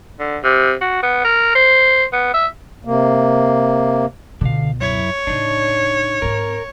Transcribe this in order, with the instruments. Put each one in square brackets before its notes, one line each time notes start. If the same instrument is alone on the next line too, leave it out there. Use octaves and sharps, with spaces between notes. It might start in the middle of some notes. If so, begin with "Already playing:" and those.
[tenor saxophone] D3
C3
F#4
B3
A#4
C5
B3
E5
[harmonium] C3 A#3
[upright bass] C#2 B2 [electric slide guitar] D3 F5
[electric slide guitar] F#2 E4 [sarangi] C#5
[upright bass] A2 C#3 [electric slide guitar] D4 D#4
[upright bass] G#2 C4 [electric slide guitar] A#4